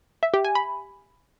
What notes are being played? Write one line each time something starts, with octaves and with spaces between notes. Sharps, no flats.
E5
G4
G#5
B5